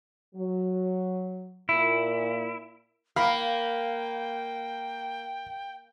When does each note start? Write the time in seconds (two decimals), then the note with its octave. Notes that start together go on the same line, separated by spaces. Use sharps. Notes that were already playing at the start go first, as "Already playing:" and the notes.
0.36 F#3
1.69 A#2 E4
3.16 A#3 F5 G5 B5